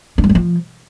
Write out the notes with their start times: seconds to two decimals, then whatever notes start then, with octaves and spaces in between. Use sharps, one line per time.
0.18 D4
0.24 F#3
0.29 G3
0.35 F3